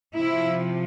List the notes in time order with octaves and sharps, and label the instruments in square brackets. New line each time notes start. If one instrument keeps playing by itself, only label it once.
[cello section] C3 F3 E4